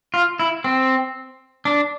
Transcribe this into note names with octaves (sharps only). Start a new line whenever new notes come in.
F4
E4
C4
D4